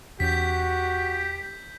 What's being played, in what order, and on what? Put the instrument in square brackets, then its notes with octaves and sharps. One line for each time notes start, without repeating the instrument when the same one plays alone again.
[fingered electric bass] E2 C#4 [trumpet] F#4 [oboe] G4 [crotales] G6 B6